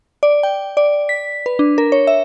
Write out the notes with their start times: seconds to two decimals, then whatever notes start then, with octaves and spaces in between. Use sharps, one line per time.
0.23 D5
0.43 G5
0.77 D5
1.09 B6
1.46 B4
1.59 D4
1.78 A#4
1.92 C#5
2.07 E5